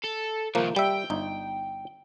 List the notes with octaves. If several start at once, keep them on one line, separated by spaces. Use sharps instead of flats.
A4
C2 D#3 F3 A#3
G3 E5 G5
G1 D#4